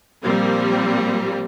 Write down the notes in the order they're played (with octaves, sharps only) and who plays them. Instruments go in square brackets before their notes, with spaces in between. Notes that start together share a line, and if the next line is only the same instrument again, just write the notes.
[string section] A#2 F3 G3 A#3 C4